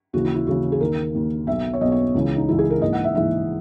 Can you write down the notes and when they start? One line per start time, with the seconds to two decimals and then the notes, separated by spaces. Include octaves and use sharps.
0.13 D#2 C#3 E3 F#4
0.25 E4
0.35 E4
0.47 D#2 C#3 E3 F#4
0.72 G#4
0.80 D#2 D#3 A#4
1.15 D#2 D#3
1.47 B1 B2 E5
1.74 C#5
1.81 B1 B2 D#5
1.92 C#5
2.14 C#2 C#3 E3
2.37 D#4
2.49 C#2 C#3 E3 E4
2.59 G#4
2.70 A#4
2.82 A#1 G#2 E3 D#5
2.93 F#5
3.04 E5
3.15 A#1 G#2 E3 E5